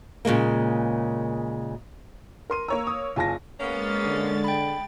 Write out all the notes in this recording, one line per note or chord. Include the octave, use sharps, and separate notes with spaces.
A#2 C#3 G#3 A#3
A#4 C6 D#7
A#3 C#5 A#5 E6
D#6
F#1 F4 G#5 A5 A#6
G#3 A#3 B3 C#4 A6
D3
G5 B5